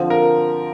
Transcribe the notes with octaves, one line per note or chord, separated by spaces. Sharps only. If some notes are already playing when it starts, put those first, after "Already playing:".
Already playing: D3 F3 C4 F4
A#4